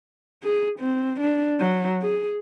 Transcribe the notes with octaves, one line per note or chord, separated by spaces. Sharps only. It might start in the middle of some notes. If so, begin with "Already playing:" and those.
G#4
C4
D4
F#3
G#4